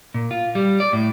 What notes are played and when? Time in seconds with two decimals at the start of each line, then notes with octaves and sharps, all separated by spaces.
0.14 A#2
0.31 F4
0.55 G3
0.80 D5
0.93 A2